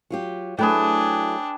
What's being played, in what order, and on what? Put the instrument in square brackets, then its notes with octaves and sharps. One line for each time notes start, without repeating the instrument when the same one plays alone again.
[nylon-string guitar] F#3 F4 G4
[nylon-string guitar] F#3 A3 E4 [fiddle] D4 [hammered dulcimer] G#4 B4 G5